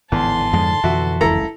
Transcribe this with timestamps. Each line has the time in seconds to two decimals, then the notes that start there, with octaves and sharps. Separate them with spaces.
0.12 G#1 E2 A2 D3 A5 C6
0.53 F2 G#2 D3 F3 G#3
0.84 F2 B2 D3 E3 F#4 E5
1.21 F#1 C#2 D3 E4 A4 A#5